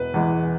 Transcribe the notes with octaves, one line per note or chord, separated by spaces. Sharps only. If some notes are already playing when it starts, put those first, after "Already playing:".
Already playing: E1 B4
E2 E3 G#3